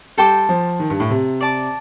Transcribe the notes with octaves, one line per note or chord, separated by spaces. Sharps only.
G3 A4 C5 G5 D6
F3
D#3
G2
A2
C3
D5 A5 D6